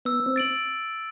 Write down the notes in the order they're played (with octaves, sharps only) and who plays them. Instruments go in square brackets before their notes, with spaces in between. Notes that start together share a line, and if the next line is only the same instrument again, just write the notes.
[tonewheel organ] B3 [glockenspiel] E6
[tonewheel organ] C4
[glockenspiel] A6 D7 F#7